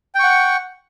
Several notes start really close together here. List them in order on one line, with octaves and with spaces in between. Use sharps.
G5 C#6 F#5